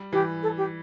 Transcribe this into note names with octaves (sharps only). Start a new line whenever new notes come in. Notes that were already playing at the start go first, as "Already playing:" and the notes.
Already playing: G3
E3 G4
A4
G4